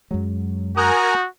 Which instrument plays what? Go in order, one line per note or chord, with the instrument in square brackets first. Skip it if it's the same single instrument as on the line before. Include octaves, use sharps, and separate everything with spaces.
[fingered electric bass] F#2 G#3 [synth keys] F#3
[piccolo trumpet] F#4 [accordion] A#4 G#5 A#5 [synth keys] D#6 F#6 G6